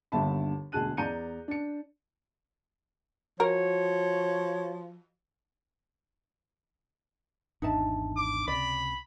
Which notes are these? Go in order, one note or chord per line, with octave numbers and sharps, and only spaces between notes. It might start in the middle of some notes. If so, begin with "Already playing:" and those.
G1 D#2 D3 E5 A5 B5
E1 D2 G#4 A5 F#6 D#7
E2 D5 A#5 G6 C#7 D#7
D4 C#7
F3 F#4 A#4 C#5
G#1 E2 D4 D#4 E5 A5
D6
C#2 C3 D5 B5